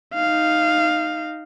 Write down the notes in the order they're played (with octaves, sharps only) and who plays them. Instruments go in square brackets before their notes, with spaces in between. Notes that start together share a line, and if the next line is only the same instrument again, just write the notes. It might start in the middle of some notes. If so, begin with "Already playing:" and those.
[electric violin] D#4 F5